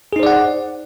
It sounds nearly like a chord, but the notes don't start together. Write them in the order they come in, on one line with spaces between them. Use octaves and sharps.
G#4 D#4 C5 D5 F#5